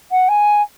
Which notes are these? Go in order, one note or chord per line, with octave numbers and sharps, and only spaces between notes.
F#5
G#5